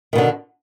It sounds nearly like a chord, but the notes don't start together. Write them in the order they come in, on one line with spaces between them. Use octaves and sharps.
D#3 B2 D3